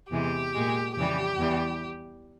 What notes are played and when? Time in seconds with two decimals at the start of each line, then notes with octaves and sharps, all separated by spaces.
0.11 E2 C3 E3 G#3 G4
0.53 A#2 G#3
0.96 F2 C#3 E3 G3 G4
1.39 E2 E3 G3